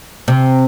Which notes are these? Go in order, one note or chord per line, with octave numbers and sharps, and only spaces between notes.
C3